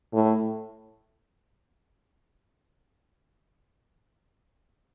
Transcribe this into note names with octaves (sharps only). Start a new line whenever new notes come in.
A2